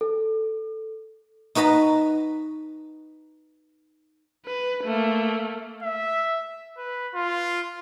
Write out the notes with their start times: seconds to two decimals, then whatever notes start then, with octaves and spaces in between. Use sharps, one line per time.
0.01 A4
1.55 D#4 F#4 B4 D#5 A5 A#5
4.46 B4
4.84 A3 A#3
5.82 E5
6.77 B4
7.14 F4